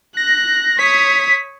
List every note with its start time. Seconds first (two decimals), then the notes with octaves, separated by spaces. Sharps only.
0.17 F#6 A#6
0.79 C#5 D#6 B6